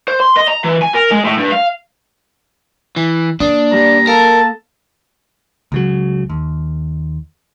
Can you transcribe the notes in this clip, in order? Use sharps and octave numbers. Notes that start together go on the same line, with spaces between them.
C5
C6
D#5
A#5
E3
G#5
A#4
G#3
A2
G2
F5
E3
A#3 D4 D#6 C7
G2 G3 A#5
A4 A#4 F5 A5 A#5
C#2 C#3 F#3
D#2